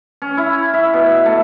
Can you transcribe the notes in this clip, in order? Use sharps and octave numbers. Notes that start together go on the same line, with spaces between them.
C#4
E4
E5
B2
A3